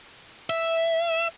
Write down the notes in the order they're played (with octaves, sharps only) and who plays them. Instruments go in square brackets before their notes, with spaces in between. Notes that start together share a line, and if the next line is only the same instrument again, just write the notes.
[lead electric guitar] E5